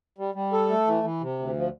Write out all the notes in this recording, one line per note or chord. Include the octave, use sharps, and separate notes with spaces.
G3
G3
A4
A3
E3
E3
C3
D2
F3